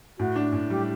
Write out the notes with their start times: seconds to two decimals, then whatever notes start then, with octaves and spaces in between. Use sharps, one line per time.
0.18 A2 F#4
0.36 D4
0.53 A2
0.70 G3 G4